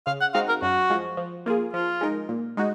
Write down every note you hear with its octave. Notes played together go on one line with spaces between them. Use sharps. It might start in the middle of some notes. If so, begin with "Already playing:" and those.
C#3 F5
F#5
G#3 C4 D#4 F#4 F5
A#4
F#2 F#4
F3 G#3
F3
A#3 F4 G#4
F3 F4
G#3 D#4 A#4
A#2
G#3 D#4 F#4